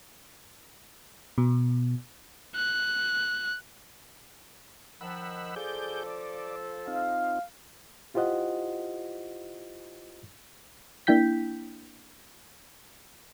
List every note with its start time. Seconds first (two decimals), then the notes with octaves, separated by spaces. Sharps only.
1.38 B2
2.56 F#6
5.01 D#3 F3 F#5 B5 E6
5.56 F3 G#4 A4 D5 G6
6.06 D5
6.87 C4 D#4 F4 F5
8.14 E4 F4 G4 C5 D#5 F#5
11.07 A#3 D4 E4 G5 G6 B6